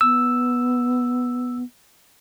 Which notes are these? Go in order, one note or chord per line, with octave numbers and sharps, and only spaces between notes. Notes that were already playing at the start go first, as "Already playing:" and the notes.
B3 E6